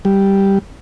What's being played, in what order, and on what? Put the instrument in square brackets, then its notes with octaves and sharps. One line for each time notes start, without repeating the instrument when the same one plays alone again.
[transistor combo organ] G3